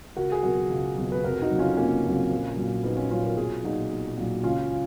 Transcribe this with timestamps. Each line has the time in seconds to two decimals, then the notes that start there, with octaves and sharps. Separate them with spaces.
0.16 C#2 F#4 A#4
0.32 G#4
0.43 B2 F#3 F#4 A#4
0.70 C#2
0.97 B2 F#3
1.12 B4
1.24 F1 F#4 A#4
1.42 D#4 F#4
1.51 F2 C#3 F#3
1.59 C#4 F4
1.77 F1 A#3 C#4
2.04 F2 C#3 F#3
2.30 A#1
2.57 A#2 F#3
2.83 A#1 B3 D#4
2.97 C#4 F4
3.10 A#2 F#3 C#4 F4
3.23 F#4 A#4
3.37 B1 F4 G#4
3.63 A#2 F#3 D#4 F#4
3.90 B1
4.17 A#2 F#3
4.44 C#2 C#4 F4